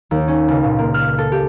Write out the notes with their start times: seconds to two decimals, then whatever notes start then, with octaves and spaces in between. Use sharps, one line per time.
0.11 D#2
0.28 C#4
0.48 C#2
0.64 A#2
0.79 A#3
0.94 F6
1.18 A4
1.32 G4